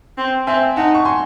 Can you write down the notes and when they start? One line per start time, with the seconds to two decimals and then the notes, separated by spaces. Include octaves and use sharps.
0.18 C4
0.47 C4 E5 G#5
0.76 D#4 F#5 A5
0.95 C#6
1.05 G#5 C6